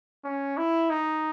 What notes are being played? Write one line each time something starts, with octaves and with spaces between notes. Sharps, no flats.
C#4
E4
D#4